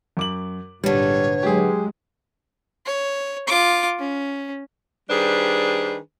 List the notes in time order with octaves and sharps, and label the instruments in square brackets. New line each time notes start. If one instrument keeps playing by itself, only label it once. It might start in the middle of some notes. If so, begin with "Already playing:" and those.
[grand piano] F#2 D6 F#7
[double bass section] G#1 A#2 [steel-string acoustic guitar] D3 B4 [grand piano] G3 [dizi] C#5
[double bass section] F#3 G#3 [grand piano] G4 G#4
[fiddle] C#5
F4 D6
C#4
[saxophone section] D#3 G3 D4 G#4 B4 C5